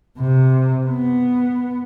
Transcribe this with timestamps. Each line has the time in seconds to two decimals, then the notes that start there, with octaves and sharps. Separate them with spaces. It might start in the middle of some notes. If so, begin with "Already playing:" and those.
0.19 C3
0.87 B3